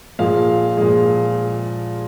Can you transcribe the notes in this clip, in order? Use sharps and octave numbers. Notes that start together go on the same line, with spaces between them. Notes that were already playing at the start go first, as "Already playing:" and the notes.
A#2 F3 G#3 F5
A#2 F3 G#3